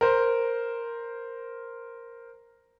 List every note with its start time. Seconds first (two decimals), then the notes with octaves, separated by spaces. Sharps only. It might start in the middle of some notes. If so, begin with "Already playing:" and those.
0.01 A#4 C5